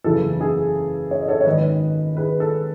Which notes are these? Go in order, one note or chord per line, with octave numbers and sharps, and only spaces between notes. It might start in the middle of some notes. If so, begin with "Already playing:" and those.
F#1 E2 C#3 E3 A4
G#4
C#5
D#5
A4 C#5
C#5
G#1 G#2 D#3 B4 D#5
G#4 B4
A4